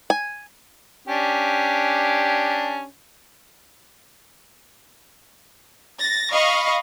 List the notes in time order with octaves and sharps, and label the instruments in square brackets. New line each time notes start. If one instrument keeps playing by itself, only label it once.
[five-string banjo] G#5
[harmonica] C#4 D4 G4
[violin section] A6 A#6
D#5 F5 B5 C#6